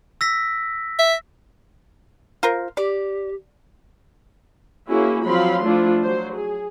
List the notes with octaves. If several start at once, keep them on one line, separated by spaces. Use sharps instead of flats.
E6 A#6 B6
E5
F4 A#4 C5
G4 D5
A#3 C#4 E4 F#4 G#4
F3 F#3 C4 F5 B5 C6
F3 A3 D4 E4 F4
F#3 C5
G#4